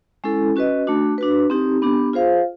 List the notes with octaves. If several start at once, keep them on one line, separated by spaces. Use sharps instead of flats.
G#3 C#4 E4 A4
C#4 F#4 B4 D#5
A3 D4 F#4
D4 F#4 B4
C4 D#4 G4
B3 D4 G4
F4 G#4 C5 F5